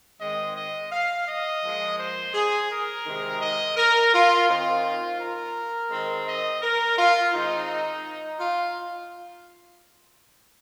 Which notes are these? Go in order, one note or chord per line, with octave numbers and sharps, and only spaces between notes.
G#2 D#3 G#3 C4 D#5
D#5
F5
D#5
A#2 F3 G#3
C5
G#4
A#4
C3 D#3 G#3 C4
D#5
A#4
F4
D#3 C4 F4
A#4
D#3 G#3 C4
D#5
A#4
F4
D#3 G#3 C4 D#4
F4